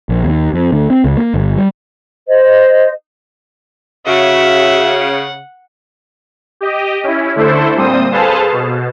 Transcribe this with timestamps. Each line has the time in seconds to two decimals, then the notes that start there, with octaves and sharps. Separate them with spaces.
0.09 A#1
0.24 D#2
0.53 F2
0.72 D2
0.90 C4
1.04 C#2
1.17 A#3
1.34 G1
1.56 G3
2.28 C5 D#5
4.07 C#3 F#4 E5 F#5
6.61 G4 D#5
7.04 C#4 E4
7.36 D3 A3 E4 A4 C5
7.76 A#2 G3 C4 C5 D#6
8.12 G#4 A4 B4 C5 F5 A5
8.52 B2